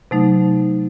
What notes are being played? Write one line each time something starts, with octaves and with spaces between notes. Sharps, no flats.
C3 F#3 A3 D#4